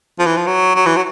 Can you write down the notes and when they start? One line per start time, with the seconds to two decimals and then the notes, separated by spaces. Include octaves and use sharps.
0.19 F3
0.26 E3
0.37 F3
0.47 F#3
0.75 F#3
0.86 E3
0.96 F#3